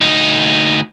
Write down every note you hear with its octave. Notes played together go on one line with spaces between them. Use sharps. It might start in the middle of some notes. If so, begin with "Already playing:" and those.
D2 D#4